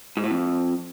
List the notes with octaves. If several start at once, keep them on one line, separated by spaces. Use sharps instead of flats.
G#2
A2
F2